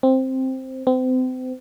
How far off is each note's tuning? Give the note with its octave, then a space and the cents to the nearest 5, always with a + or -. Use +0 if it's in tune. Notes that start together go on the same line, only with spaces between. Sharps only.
C4 +5
C4 -35